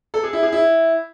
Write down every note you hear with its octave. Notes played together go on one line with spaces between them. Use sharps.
A4
G#4
E4
G#4
E4